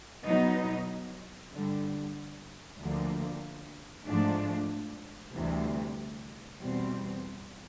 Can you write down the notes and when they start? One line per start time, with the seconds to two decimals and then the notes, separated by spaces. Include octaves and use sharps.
0.24 B2 F#3 B3 D#4
1.52 G2 D3 G3
2.78 D2 D3 F3 A#3
4.06 G#2 F3 A3 D4
5.33 D2 C3 E3 G3
6.60 E2 B2 G3 C4